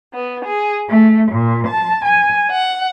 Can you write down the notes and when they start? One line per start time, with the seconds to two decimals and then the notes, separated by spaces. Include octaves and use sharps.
0.12 B3
0.44 G#4
0.89 A3
1.31 A#2
1.67 A5
2.05 G#5
2.49 F#5